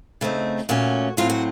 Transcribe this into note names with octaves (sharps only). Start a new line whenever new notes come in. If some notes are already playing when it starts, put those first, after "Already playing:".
C#3 A3 C4 D#4
A#2 A3 C#4 F#4
A2 F#3 C4 F4
F#4